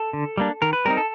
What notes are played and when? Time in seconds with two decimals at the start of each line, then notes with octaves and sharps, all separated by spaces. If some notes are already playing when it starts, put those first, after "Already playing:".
Already playing: A4
0.13 D3
0.38 G3 A#3 D4
0.62 D#3 A#4
0.73 B4
0.85 G3 C4 D#4 A#4
0.97 A4